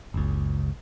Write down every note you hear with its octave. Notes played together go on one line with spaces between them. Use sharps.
F#1 C#2